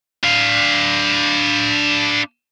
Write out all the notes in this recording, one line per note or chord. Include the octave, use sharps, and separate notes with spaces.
D4 F5